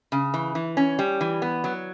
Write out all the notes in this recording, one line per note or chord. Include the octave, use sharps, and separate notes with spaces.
C#3
E3
E3
C#4
G3
E3
B3
F#3